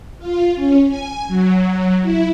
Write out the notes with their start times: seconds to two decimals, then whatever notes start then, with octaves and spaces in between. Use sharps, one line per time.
0.19 F4
0.55 C#4
0.86 G#5
1.28 F#3
2.02 E4